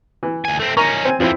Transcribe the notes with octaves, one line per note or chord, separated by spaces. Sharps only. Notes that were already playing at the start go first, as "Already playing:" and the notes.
E3
D2 G#5
A3 C4
C#4 D#4 A#4 A#5 C#6
C4 G#5
F2 E3 F3 C4 E4